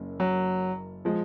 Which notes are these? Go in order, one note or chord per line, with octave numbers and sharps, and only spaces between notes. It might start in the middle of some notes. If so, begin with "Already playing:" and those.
Already playing: F#1 F#2 A#3
F#3
F3 G#3